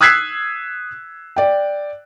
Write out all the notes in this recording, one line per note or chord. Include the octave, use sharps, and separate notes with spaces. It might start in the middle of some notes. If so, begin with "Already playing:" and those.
D#6 E6 F#6 G#6 B6 C7
D5 G5